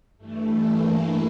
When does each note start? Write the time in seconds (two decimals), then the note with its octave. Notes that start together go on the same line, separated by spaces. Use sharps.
0.18 G2 E3 A3
0.67 A#3